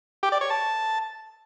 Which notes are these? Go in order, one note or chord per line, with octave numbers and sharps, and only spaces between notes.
G4
D5
C#5
A5